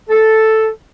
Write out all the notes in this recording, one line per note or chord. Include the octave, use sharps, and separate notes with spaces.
A4